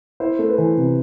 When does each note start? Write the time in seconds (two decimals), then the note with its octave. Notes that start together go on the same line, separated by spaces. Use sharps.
0.20 E4 C5
0.39 A3
0.49 B4
0.58 E3
0.77 C3